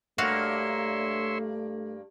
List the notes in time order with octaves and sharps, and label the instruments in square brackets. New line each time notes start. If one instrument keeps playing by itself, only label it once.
[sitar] G2 A#3 [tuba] A3 [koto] F#4 F5 [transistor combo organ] C#5 E5 C6